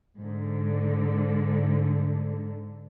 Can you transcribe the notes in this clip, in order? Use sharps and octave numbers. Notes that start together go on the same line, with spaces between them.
G#2 D3